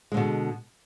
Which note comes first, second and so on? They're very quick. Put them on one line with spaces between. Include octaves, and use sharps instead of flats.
G#3 D3 B2